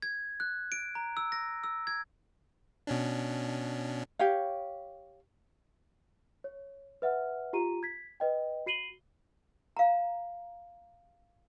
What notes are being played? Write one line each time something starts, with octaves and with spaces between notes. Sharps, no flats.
G#6
F#6
D7
A#5
E6
A#6
E6
G#6
B2 C#4 D4
G4 C#5 F5
C#5
B4 E5 F#5 F6
F4 G4 A#5 D#7
G#6 B6
B4 D#5 G5
F#4 C7 D#7 F#7 G7
F5 A#5